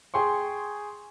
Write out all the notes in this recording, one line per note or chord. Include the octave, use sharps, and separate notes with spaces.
G#4 G5 C6 C#6